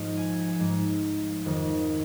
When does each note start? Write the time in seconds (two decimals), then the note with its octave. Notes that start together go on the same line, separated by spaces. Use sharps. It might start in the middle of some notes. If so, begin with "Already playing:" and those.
Already playing: G#2 F3 G#3 F5
0.17 G#5
0.60 G#2 F3 G#3
1.45 F2 D#3 G#3